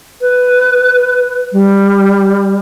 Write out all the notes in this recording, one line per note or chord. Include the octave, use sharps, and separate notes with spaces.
B4
G3